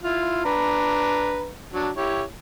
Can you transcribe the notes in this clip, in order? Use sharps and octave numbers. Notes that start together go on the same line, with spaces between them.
E4 F4
D4 B4 A#5
F#3 D4
E4 G4 C#5